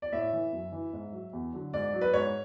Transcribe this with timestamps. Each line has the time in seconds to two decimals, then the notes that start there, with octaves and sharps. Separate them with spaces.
0.02 D5
0.13 A2 E5
0.33 E3
0.53 F#2
0.72 E3
0.93 G#2
1.12 F#3
1.33 E2
1.53 D3 F#3
1.73 G#2 D5
1.94 F#3
2.01 B4
2.13 G#2 C#5